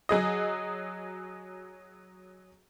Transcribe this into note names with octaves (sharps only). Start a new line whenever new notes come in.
F#3 G#4 D#5